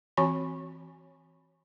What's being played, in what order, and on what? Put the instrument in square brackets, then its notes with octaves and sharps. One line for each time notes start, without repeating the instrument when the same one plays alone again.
[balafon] E3 C4 F#4 C#5 G#5 B5